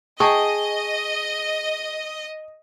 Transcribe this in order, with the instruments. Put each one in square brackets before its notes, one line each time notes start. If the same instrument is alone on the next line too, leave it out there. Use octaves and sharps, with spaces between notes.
[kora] G#4 [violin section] D#5 [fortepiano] G5 A5 C#6